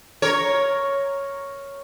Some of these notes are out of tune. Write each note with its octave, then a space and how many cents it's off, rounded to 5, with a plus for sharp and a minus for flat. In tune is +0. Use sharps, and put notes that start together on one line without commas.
A#4 +0 C#5 +0